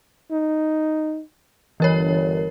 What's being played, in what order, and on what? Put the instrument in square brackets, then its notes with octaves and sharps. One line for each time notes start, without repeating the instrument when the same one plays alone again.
[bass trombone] D#4
[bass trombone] G1 [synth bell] E3 A#4 C#5